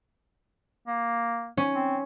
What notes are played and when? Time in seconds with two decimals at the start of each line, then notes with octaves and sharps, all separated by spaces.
0.88 A#3
1.57 C#4
1.75 C4